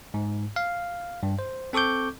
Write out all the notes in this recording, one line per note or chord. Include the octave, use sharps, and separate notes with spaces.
G#2
F5
G2
C5
C4 A4 C#6 D6 G6